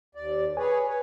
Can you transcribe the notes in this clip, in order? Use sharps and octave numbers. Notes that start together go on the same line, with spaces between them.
D#2 D5
G#4 B4 C#5 G#5
B4 C#5